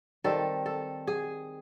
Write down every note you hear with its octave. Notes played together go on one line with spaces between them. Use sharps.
D#3 G3 C4 A4
A4
G#4